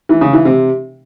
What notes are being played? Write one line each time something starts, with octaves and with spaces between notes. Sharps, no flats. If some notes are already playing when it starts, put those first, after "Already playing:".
E3
C#3
E3
C3